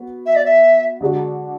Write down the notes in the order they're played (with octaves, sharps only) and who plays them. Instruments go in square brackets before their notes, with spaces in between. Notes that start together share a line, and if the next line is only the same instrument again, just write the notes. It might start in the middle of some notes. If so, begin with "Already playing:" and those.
Already playing: [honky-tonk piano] B3 F#4
[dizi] E5
D5
E5
[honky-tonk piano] D3 G#3 D4 F#4